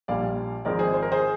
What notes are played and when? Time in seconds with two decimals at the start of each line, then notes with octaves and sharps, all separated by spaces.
0.08 A#1 A#2 G3 D5 F5
0.65 G#1 G#2 F3 G#3 C4 A#4 D5
0.79 G#4 C5
0.94 C5
1.02 A#4
1.12 G#4 C5